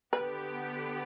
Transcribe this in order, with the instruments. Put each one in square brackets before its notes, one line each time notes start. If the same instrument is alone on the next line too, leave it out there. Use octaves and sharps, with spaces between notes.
[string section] D3 B3 G4 [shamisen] B4